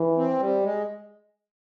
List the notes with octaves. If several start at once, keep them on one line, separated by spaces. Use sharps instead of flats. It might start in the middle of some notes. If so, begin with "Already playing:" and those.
Already playing: E3
C4
G3
G#3